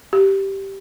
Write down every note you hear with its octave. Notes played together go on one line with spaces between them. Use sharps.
G4